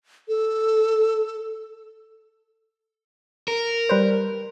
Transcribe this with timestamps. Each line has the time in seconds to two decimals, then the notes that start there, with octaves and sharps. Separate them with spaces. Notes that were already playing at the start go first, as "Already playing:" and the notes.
0.28 A4
3.48 A#4
3.89 G3 B4 C5